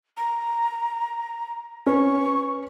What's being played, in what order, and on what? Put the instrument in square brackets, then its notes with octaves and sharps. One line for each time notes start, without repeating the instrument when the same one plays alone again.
[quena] A#5
[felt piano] C#4 B4 [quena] C#6